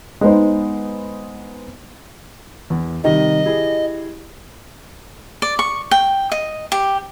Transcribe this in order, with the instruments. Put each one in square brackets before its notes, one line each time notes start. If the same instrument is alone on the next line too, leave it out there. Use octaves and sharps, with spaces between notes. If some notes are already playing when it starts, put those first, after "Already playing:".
[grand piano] G#3 B3 D#4 C5
[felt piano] E2
[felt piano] C3 D#3 G3 [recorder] D#5
[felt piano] E4 G4 G#4
[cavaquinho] D5
C#6
G5
D#5
G4